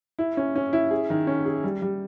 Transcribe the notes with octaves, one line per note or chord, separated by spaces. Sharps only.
E4
C#4
C#4
E4
G#4
D#3
C#4
G#4
G3
G3